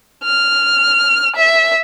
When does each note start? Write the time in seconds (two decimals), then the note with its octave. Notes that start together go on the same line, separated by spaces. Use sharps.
0.24 F6
1.36 E5